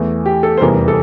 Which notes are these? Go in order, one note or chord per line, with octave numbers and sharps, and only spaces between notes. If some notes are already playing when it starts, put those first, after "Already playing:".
Already playing: E2 E3 A3
G4
A4
C5
F1 E2 E3 G3 A#4
A4